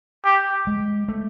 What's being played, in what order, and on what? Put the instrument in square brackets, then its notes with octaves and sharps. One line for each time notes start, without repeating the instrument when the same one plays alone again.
[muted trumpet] G4
[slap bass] G#3
A3